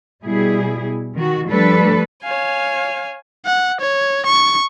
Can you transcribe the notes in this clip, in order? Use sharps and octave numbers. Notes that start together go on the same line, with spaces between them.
B2 G3 E4 G#4
D#3 F#4
F3 G3 A3 D4 A4 B4
C#5 F5 G#5
F#5
C#5
C#6